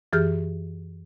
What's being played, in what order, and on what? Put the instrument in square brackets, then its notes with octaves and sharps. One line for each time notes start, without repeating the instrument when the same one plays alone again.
[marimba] F#2 E3 G4 G#4 F6 G6